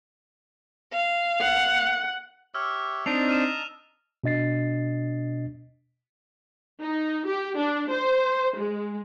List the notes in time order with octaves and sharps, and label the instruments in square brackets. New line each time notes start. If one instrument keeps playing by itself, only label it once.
[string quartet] F5
[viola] F#5
[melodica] G4 C#5 E5 [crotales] E6 F6
[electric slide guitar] C4 D4 D#4 [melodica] D#5 A5 A#5 [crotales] F7
[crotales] F6 D#7 E7
[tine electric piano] B2 D4 D#5 A6 C7
[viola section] D#4
G4
D4
C5
G#3